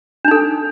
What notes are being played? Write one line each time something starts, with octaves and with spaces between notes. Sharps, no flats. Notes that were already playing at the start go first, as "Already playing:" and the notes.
D4 D#4 A4